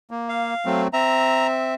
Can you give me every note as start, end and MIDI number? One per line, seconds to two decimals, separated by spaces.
0.11 0.54 58
0.29 0.82 77
0.66 0.88 54
0.66 0.88 57
0.66 0.88 60
0.93 1.75 60
0.93 1.75 76
0.93 1.47 82